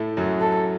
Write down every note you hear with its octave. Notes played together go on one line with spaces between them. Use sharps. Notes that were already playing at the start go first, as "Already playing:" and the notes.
Already playing: A2 A3
F#2 F#3
A4